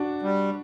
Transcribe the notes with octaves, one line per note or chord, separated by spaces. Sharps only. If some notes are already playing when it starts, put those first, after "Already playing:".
Already playing: D4 F#4
G3